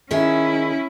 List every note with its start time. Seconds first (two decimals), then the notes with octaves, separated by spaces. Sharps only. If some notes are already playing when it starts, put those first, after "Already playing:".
0.11 D#3 C#4 E4 G#4 E5